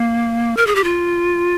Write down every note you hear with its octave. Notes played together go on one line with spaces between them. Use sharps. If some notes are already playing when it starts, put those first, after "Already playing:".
Already playing: A#3
A#4
G#4
G4
F4